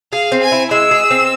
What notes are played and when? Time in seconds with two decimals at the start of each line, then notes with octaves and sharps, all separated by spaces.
0.12 G#4 F5
0.32 C4
0.42 G#5
0.52 E4
0.71 G#3 E6
0.91 G#4
1.11 C4